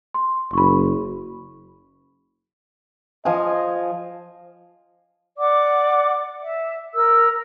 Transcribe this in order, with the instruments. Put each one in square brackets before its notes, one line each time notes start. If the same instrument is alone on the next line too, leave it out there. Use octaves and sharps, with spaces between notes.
[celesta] C6
[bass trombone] F#1 [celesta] B5 C#6
[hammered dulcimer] F3 G#5 [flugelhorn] D#5
[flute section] D5 F#5 D6
E5
A#4 E6